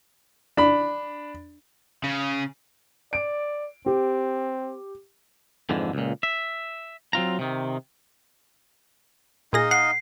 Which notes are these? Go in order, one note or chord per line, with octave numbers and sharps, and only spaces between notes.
D4 B5
C#3
D5 D7
C4 G4
F2 G#2 D3 E3
C#2 A#2
E5
F#3 C4 F4 A#5
C3 D#3
A#2 D#4 G#4 D#5 F5 A#6
F#5 C7